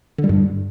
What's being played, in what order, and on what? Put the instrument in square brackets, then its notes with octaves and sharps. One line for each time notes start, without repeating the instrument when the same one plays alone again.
[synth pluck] D3
G3
G2